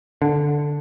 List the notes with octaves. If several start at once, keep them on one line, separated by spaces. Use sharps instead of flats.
D3